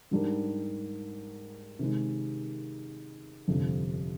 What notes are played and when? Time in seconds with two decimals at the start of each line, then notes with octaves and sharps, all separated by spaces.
0.11 G#2 G3 D4 G4 A#4
1.79 C3 D#3 G#3 D#4
3.48 G1 F2 C3